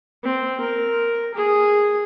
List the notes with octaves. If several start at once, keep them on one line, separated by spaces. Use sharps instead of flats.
C4
A#4
G#4